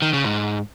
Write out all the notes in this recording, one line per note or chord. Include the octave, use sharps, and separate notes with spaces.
D#3
C#3
G#2